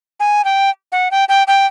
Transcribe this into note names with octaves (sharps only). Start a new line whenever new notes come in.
G#5
G5
F#5
G5
G5
G5